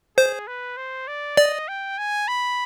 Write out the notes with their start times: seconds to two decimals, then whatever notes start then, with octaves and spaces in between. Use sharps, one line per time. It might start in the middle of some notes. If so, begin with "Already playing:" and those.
0.17 G#4 C5
0.47 B4
0.77 C5
1.07 D5
1.37 D5 D#5
1.68 G5
1.98 G#5
2.28 B5